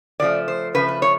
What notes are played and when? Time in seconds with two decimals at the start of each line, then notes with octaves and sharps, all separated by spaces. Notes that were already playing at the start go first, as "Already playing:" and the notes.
0.20 C#3 F3 A3 D5
0.48 C5
0.75 C#3 F3 A3 B4
0.88 B4
1.02 C#5